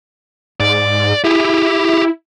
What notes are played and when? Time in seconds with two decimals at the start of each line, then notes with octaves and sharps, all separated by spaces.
0.60 G#2 D5
1.24 E4 G4 G#4